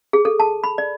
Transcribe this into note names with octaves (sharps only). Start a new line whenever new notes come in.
G#4
A4
A5
B5
D5